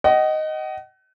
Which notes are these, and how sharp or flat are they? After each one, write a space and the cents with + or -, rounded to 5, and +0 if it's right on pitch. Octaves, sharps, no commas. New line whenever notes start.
D#5 +0 F#5 +40